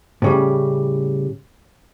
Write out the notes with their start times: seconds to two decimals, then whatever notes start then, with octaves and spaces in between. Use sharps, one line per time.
0.22 A2 C#3 G3